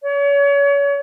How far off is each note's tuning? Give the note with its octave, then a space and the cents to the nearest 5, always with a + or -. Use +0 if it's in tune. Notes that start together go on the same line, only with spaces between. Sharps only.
C#5 +35